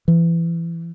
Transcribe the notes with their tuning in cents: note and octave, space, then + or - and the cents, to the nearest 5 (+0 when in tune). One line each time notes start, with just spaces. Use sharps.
E3 +25